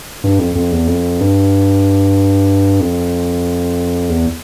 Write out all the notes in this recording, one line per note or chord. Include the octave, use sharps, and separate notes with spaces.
G2
F2
F2
E2
F2
G2
F2
E2